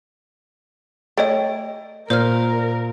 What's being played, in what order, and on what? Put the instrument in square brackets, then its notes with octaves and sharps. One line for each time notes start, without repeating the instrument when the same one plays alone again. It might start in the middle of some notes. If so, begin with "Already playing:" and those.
[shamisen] A3 D#5 [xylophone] C#5 G5 A6
[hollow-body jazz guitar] A#2 [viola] A#4 [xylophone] C5 F6